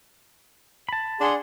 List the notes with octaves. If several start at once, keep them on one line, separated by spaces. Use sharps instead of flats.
A5 B5
D4 G#4 F#5 C6